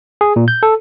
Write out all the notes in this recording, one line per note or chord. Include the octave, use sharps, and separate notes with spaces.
G#4
A#2
G6
A4